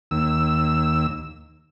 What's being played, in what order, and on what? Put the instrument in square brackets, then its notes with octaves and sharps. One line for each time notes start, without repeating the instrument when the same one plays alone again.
[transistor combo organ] D#2 E6